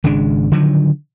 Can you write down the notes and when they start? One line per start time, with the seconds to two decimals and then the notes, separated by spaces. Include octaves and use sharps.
0.04 G#1 C#3 G#3 D4
0.52 D3 D#3 F3 F#3